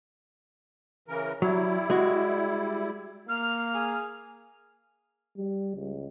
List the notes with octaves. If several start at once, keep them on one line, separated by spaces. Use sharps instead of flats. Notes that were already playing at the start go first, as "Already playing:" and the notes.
C#3 E3 A#4
F#3 G3 E4
G#3 F#4
A#3 F6
G#4
G3
C#2